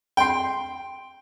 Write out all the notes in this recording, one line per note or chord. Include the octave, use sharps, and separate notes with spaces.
G5 C6